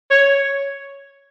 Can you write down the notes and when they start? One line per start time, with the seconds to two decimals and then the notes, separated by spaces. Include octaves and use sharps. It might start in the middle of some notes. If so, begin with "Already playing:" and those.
0.11 C#5